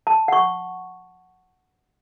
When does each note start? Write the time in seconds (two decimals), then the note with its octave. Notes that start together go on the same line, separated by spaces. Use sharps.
0.07 A5
0.28 F#5 C#6